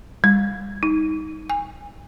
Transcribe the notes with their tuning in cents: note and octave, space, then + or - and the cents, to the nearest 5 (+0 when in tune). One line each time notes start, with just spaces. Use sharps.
G3 +35
D#4 +20
G#5 -30